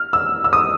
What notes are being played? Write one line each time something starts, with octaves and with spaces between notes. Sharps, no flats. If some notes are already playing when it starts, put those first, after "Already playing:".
Already playing: F6
E6
E6
D#6